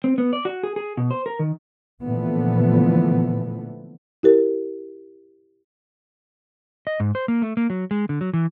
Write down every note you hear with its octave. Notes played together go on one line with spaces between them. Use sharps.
C4
B3
D5
F#4
G#4
G#4
B2
C5
A#4
D#3
A#2 D3 E3 F3 A3 B3
E4 G4 A#4
D#5
G#2
C5
A#3
A3
A#3
F#3
G#3
D3
F#3
E3